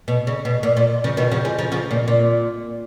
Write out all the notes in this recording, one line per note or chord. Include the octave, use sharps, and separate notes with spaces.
B2
C#3
B2
A#2
A#2
C#3 F3
B2 D#3
C#3 F3
F3 G#3
C#3 F3
C#3 F3
A#2
A#2